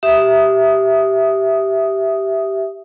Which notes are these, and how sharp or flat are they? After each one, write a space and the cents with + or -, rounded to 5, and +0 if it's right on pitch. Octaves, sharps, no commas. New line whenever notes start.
G4 -10 E5 +0 D#6 +0